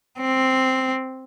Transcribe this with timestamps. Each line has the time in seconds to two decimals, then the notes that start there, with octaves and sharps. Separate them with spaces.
0.20 C4